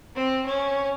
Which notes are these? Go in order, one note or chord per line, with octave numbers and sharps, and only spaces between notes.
C4
C#4